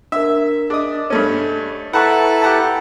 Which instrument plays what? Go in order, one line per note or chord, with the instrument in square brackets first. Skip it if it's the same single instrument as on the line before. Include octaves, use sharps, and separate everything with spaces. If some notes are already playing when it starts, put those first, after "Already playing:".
[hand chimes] D4 A#4 [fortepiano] E5
[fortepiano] D4 D#6 [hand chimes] G#4 D#5
[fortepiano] G2 A3 C#4
[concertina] E4 A4 B4 [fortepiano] F#5 A5 C#6 [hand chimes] A#5
[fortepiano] G4 F#5 A5